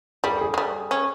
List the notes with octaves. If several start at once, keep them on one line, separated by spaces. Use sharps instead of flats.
G3 G#4
A4
G#4
G#3
G3
C#4